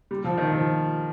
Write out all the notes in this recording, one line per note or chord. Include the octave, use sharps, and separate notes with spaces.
G3
F3
D#3
F3